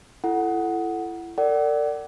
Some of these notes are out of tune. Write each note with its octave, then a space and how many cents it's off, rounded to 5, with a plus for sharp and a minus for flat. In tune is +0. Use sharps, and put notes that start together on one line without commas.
E4 +35 A4 +0 F#5 +0
A#4 -45 D5 +0 F#5 +35